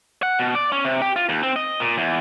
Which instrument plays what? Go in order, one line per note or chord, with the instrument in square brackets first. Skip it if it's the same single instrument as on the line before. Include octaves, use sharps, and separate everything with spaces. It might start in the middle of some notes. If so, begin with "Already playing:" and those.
[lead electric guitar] F#5
B2
D5
C#4
C3
G4
F4
D#2
C4
D#5
A#2
E2